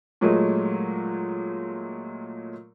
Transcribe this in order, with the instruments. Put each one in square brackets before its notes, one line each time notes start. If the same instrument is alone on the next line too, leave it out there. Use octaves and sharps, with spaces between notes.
[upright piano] A#2 F#3 G#3 A3